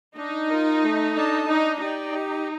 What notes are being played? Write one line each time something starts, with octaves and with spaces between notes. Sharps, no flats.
D4 D#4
F4 A#4
A3
D4 A4 D#5 A5
D4 D#4
D#4 G4 D5 G5
G4